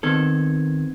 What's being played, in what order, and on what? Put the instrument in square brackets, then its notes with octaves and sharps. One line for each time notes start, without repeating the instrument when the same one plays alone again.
[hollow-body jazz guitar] D#3 A4 [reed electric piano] B3 C4 G#6